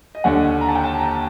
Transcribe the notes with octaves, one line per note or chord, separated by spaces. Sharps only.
D#5
D#2 D3 F#5
A#5
A5
G5
A5
A#5